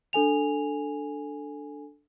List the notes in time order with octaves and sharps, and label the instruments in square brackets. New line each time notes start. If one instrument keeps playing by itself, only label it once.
[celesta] D4 A4 G#5 F7